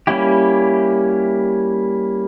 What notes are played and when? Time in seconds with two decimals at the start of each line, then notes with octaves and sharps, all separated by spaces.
0.07 G3 A#3 C#4 E4 G4